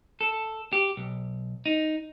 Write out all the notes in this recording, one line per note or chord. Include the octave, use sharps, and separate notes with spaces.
A4
G4
B1
D#4